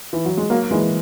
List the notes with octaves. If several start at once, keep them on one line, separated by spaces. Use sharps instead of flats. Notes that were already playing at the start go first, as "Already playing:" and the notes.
E3
F#3
G#3
F#3 A#3
E3 G#3